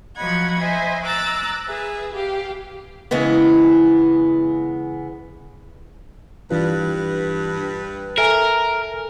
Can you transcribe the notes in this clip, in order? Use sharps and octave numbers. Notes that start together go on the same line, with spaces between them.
F3 F#3 D#5 F#5 B5 G#6
C5 D#5 E5 G#5
A#5 D6 E6 F#6 A6
G#4 B4 E5
G4 F5
C#3 E3 G#3 B3
G2 E3 D4 F4 B4
A4 A#4 E5 G#5